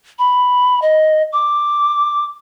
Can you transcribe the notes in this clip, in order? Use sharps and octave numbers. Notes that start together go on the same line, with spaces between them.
B5
D#5
D6